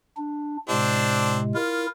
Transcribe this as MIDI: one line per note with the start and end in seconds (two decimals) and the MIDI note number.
0.17 0.57 62
0.69 1.54 45
0.69 1.54 48
0.69 1.54 56
0.69 1.38 60
0.69 1.38 62
1.55 1.86 64
1.55 1.87 65
1.55 1.86 70